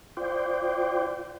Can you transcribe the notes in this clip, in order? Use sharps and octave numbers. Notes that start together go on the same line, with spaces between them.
F4 C5 D5 G5